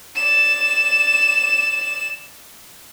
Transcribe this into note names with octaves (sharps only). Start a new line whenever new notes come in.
D5 E7